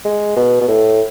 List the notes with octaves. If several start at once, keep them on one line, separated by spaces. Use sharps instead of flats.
G#3
B2
B2
A2